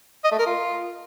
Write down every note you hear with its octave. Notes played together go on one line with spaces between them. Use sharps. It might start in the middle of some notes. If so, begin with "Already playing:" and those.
D#5
A3
A#4
F4